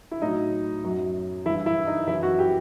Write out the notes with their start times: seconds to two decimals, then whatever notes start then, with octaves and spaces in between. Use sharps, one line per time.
0.11 E4
0.22 A2 F#3 D#4
0.84 F#2 F#3
1.46 E3 E4
1.50 G2
1.66 E4
1.87 D#4
2.07 F#2 E3 E4
2.23 F#4
2.39 G4